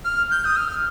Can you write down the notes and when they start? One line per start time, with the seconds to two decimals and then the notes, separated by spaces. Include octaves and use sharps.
0.05 F6
0.31 G6
0.45 D#6
0.56 F6